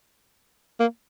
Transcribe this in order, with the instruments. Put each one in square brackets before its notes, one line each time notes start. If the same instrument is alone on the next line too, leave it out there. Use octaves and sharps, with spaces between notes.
[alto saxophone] A#3